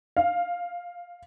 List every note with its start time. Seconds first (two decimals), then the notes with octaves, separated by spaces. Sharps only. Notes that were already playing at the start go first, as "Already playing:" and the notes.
0.17 F5